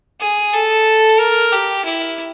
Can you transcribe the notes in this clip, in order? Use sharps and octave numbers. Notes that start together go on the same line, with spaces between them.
G#4
A4
A#4
G4
E4